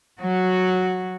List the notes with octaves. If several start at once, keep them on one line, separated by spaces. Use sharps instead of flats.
F#3 F#4